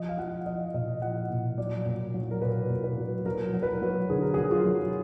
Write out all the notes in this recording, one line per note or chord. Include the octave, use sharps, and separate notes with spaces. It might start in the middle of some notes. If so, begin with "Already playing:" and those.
Already playing: F3 D#5
F5
F3 F#5
F3 D#5
A#2 D#5
F3 F#5
A#2
F#3 D5
A#2
F#3
A#4
A#2 B4
A#2
B4
F#3
F#3 A#4
F#3
B4
A#4
F#3
D3 G#4
A#4
F#3 G#4
F4
F#3